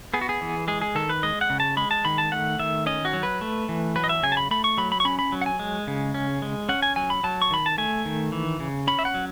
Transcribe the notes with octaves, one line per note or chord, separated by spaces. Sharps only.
B3 G#4
F#4
G#4
E3
G#3 G#4
G#4
D#3 A4
B4
G#3 D#5
F#5
C#3
A5
G#3 B5
A5
D#3 B5
A5
A3 F#5
D#3 E5
C#4 D#5
F#4
F#3
B4
A3
E3
F#3 B4
D#5
E5
C#3 G#5
A5
B5
A3 B5
C#6
F#3 B5
B5
C#6
C#4 B5
B5
F#3
F#5
G#5
G#3
C#3
C#4
G#3
C#4 F#5
G#5
F#3 G#5
B5
F#3 A5
C#6
D#3 B5
A5
A3 G#5
D#3
E3
C#3
C#4 B5
E5
F#5
F#3